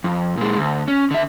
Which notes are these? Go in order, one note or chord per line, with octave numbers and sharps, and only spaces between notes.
F2
A#2 G#3
D2
C#4
D3 E5